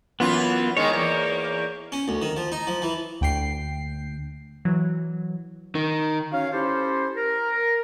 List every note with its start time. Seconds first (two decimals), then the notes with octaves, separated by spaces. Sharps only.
0.20 F#2 E3 B3 F4
0.77 D#3 G#3 C#5
0.93 E2 A#3
1.92 C#4
2.08 D2
2.22 D#3
2.37 F3
2.52 D#4
2.67 F3
2.82 E3
3.21 D2 G5 C7
4.65 E3 F#3
5.75 D#3
6.32 C#4 F#4 C#5 F5
6.52 C#4 E4 G4 A4 C5
7.16 A#4